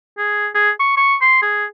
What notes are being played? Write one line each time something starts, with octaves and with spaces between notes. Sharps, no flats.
G#4
G#4
C#6
C#6
C6
G#4